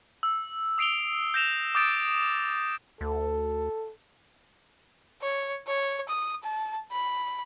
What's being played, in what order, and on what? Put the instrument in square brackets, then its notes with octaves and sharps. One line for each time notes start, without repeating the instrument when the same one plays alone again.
[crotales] E6
D#6 C7 D7 F7 G7
G6 A#6 E7 F7
D6 D#6 G6 A6 D7 E7
[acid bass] D2 [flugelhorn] A4
[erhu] C#5
C#5
D#6
A5
B5